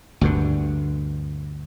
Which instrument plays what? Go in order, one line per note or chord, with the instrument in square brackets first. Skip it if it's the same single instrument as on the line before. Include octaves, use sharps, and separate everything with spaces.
[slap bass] D2 G2 D3